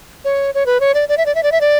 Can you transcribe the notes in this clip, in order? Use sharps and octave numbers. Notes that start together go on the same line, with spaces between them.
C#5
C#5
B4
C#5
D5
D5
E5
D5
E5
D5
E5
D5